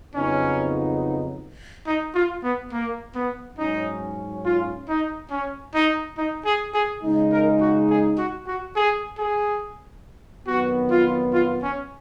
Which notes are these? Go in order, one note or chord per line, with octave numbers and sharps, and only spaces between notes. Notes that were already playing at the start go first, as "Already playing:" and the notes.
F2 C#3 F#3 B3 C#4 D#4
D#4
F4
B3
A#3
B3
G#2 F#3 C#4 D#4
F4
D#4
C#4
D#4
D#4
G#4
G#4
C#3 G#3 D#4
A#4
F#4
G#4
F#4
F#4
G#4
G#4
F2 D#3 F#3 B3 F#4
F4
F4
C#4